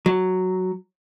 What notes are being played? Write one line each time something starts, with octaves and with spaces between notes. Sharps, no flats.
F#3